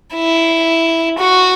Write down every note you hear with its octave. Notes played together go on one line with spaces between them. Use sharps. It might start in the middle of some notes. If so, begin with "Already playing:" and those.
E4
F#4